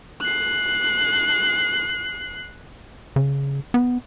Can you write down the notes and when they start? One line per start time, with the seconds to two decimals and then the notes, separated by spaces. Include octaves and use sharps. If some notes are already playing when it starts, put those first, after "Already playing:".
0.21 F#6 C7
3.16 C#3
3.74 B3